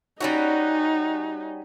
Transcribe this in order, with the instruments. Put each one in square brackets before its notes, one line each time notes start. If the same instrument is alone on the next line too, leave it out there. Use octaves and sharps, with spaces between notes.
[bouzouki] G3 C#4 F#4 [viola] D#4